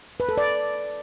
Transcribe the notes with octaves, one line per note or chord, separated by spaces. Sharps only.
B4
A4
D5